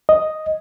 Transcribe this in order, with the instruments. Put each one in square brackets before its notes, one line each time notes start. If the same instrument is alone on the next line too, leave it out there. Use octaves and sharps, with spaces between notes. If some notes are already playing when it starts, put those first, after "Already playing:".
[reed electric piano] D#5